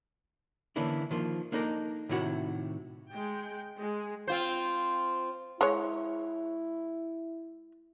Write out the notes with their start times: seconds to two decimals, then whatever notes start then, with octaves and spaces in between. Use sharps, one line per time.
0.76 D3 E3 A#3 C#4 D4 E4
1.11 D#3 F3 A#3
1.52 A#3 D4 D#4 A4 A#4
2.09 A2 C3 D#3 E4 F#4
3.10 G#3 G5
3.79 G#3
4.28 C4 F4 C5
5.61 G#3 E4 C#5